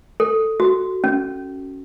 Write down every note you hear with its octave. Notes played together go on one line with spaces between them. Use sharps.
A4
F#4
C#4